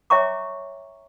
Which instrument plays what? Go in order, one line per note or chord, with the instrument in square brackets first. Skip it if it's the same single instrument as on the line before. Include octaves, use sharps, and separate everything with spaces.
[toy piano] C#5 E5 G5 A#5 C#6 D6